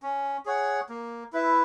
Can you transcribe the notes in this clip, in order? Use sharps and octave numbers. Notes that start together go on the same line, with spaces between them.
C#4
G#4 C#5 F#5
A#3
E4 B4 E5